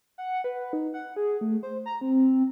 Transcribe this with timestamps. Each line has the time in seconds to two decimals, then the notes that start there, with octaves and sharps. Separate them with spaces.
0.18 F#5
0.44 B4
0.73 D#4
0.94 F#5
1.16 G#4
1.41 A3
1.63 C5
1.86 A#5
2.01 C4